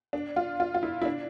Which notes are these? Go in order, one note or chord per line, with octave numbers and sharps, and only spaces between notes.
D4
F4
F4
F4
E4
E4
D4